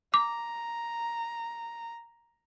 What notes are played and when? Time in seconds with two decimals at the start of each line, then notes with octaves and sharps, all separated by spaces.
0.14 A#5 D6